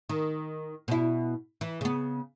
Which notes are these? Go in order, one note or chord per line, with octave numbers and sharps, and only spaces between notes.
D#3
B2 E4
E3
C#3 B3